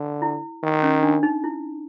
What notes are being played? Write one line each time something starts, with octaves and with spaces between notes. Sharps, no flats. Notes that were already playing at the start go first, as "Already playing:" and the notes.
Already playing: D3
E4
D#3
C#4
D4
D#4
E4